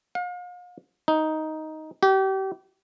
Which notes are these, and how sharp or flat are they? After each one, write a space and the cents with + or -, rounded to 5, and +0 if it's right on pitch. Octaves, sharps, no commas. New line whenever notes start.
F5 +40
D#4 +5
G4 -35